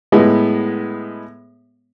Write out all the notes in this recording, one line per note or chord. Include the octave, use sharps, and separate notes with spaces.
A2 G#3 B3